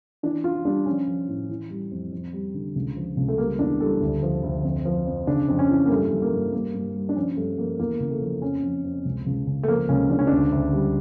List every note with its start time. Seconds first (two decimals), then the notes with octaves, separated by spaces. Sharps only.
0.23 E3 D4
0.44 E3 F4
0.65 G3 D4
0.86 F3 C#4
1.07 F3
1.28 A2
1.49 E3
1.70 G3
1.91 F2
2.13 F2
2.33 G3
2.54 D3
2.76 C#2
2.96 F3
3.17 C#2
3.28 A3
3.38 G3 A#3
3.59 E2 D4
3.80 G3 A4
4.01 D2
4.23 F3
4.43 D2
4.64 F2
4.85 F3
5.07 F2
5.27 C#3 D4
5.48 F2
5.59 C#4
5.69 E3
5.86 A#3
5.91 G2 A3
6.11 G2
6.22 A#3
6.32 G2
6.53 G2 A#3
6.74 G2
6.95 G3
7.09 D4
7.16 F3 C#4
7.37 G2 A3
7.58 F3 A#3
7.79 E2 A#3
8.00 C#3
8.11 A3
8.21 F3
8.42 F2 C#4
8.63 F2
8.85 F2
9.05 C#2
9.26 C#2
9.47 C#3
9.63 A3
9.68 F3 A#3
9.89 C#2 C#4
10.10 C#2 D4
10.19 C#4
10.27 D2 D4
10.52 D2
10.73 G3